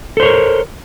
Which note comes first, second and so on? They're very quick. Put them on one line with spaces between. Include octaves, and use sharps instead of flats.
A4 C5 C#5 A#4